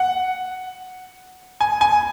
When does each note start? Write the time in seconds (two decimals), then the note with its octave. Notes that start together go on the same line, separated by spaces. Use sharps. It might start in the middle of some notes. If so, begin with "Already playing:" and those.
Already playing: F#5
1.60 G#5
1.81 G#5